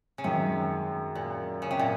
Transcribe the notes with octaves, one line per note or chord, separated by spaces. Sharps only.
C#3
F#2 C3 D#3 G#3
A#2
C#3
C3
A#2